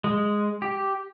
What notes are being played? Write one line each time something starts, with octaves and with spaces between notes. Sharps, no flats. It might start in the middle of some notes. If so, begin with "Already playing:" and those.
G#3
G4